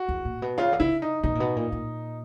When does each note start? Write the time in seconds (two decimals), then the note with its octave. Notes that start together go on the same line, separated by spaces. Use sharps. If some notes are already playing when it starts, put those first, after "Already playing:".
Already playing: F#4
0.09 E2
0.25 A#2
0.42 B2
0.58 C#3 F4
0.72 D3
0.80 C#3 E4
1.02 D#4
1.23 B2 D#4
1.35 A#2
1.40 B2
1.56 A#2
1.72 A#2